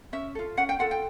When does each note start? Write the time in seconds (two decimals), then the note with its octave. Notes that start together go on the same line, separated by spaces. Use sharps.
0.13 C#4 E5
0.35 F4 A4
0.57 C#4 F#5
0.69 G5
0.79 F4 A4 F#5
0.91 G5